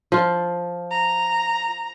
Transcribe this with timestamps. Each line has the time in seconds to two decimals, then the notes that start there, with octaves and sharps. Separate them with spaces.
0.12 F3 F4
0.91 A#5